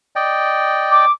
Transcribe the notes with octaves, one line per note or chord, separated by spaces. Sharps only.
D5 D#5 G5
D6